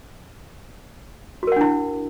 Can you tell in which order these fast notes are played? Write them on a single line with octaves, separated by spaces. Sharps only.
F#4 A#4 F#5 D4 E4